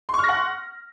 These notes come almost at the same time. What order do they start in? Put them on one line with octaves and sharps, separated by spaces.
C6 C#6 F6 A#6 F#5